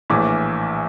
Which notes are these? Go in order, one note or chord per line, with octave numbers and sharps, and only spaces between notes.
A#1 A2 E3 D6